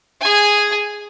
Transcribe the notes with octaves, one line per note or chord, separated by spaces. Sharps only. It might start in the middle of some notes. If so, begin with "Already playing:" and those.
G#4 G#5